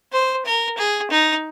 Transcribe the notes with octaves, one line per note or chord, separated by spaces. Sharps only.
C5
A#4
G#4
D#4